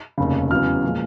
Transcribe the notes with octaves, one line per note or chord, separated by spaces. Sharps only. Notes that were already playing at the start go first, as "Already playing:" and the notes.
F1 D#2 C#3
E2 C#3 F#3 F6
A#2 F3 G#3